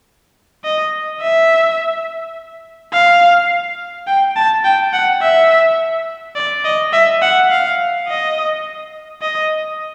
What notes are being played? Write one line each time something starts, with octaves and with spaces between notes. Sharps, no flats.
D#5
E5
F5
G5
A5
G5
F#5
E5
D5
D#5
E5
F#5
F5
D#5
D#5